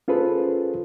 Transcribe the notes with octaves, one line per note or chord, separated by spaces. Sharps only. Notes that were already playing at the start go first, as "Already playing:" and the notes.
C#4 F4 G#4 A4 B4 C5